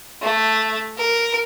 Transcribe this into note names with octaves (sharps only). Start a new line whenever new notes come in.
A3
A#4